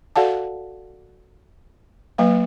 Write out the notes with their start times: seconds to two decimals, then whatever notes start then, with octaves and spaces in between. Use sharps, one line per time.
0.16 F#4 A4 D5 F5 F#5 A5
2.18 F#3 A#3 B4 F5